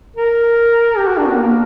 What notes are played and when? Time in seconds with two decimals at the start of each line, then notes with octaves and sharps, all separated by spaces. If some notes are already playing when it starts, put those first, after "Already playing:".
0.16 A#4
0.97 G4
1.07 F#4
1.18 D4
1.27 B3
1.38 A#3